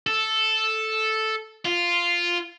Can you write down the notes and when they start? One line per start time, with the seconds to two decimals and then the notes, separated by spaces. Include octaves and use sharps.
0.07 A4
1.65 F4